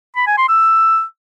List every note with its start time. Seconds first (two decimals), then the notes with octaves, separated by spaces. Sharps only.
0.16 B5
0.27 G#5
0.38 C6
0.49 E6